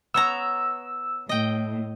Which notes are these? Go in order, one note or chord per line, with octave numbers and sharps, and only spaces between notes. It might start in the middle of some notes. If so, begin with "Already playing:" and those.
B3 C#5 A#5 E6
A2 D#5 G5